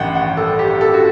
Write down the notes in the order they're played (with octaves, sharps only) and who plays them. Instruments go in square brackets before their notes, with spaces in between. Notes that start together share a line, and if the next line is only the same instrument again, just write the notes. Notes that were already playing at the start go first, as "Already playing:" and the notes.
Already playing: [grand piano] A1 G2 D#3 F#5 G5
F#5
A4
G4
A4
F#4